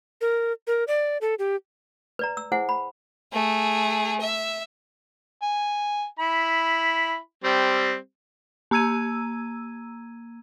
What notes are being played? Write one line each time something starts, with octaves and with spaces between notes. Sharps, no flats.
A#4
A#4
D5
A4
G4
B4 D5 A#5
E6
E4 G#4 C5 F#5 G#5
B5
A3 G#4
E5
G#5
E4 B5
G3 C4
A#3 A#5 E6 G#6 D#7